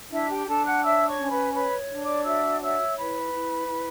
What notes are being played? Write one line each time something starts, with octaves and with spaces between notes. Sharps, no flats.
D4 E4 E5
G4 G5
D4 A4 A5
F#5 F#6
C#5 E5 E6
C#5 C#6
C#4
B4 B5
B4 C#5 B5
D4
D5 D6
F#4 E5 E6
C#5 E5 E6
E4 B4 B5
E4
E4